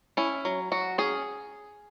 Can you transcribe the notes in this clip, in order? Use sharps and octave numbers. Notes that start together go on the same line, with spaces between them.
C#4 E4
F#3
F#3 F#4
C#4 G#4